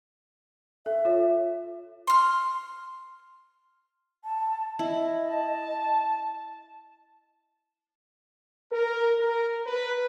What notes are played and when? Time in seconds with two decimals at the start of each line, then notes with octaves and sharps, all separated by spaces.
0.86 A4 E5
1.05 F4 C#5
2.07 C6 F6
4.24 A5
4.79 E4 D#5
5.29 A5
8.72 A#4
9.19 A#4
9.66 B4